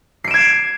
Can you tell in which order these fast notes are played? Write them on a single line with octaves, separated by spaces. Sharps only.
C7 D7 E7 G#6